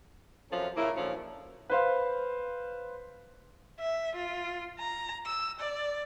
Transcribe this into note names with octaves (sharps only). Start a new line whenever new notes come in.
F#2 C3 F3 C#4 A4
A#2 C#3 A#3 E4
A#2 D3 F3 F#3 C#4
B4 C5 F5
E5
F4
A#5
E6
D5